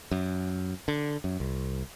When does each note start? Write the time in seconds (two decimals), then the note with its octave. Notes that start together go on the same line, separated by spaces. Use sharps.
0.11 F#2
0.88 D3
1.24 F#2
1.40 C2